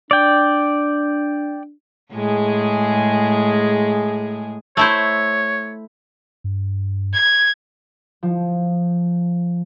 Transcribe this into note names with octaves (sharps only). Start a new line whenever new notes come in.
D4 D5 G5
A2 G#3 G#4
A3 E4 C5 C#5
G2
G#6
F3